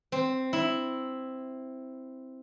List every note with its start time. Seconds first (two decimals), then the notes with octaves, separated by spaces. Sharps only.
0.12 C4
0.53 E4